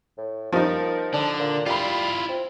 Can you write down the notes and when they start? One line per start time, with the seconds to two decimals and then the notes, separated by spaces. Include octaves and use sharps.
0.18 A2
0.52 F3 G3 A#3 D#4
1.14 D3 D4
1.40 A#2
1.66 G3 E4 F4 B5 C7
2.29 C4